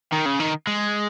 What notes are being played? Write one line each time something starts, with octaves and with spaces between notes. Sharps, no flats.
D#3
C#3
D#3
G#3